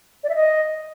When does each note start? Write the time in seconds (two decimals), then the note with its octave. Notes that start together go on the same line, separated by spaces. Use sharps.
0.24 D5
0.29 E5
0.35 D#5